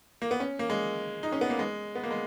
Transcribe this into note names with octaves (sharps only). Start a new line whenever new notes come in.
A#3
B3
C#4
A#3
G#3
D#4
C#4
B3
A#3
G#3
B3
A#3
G#3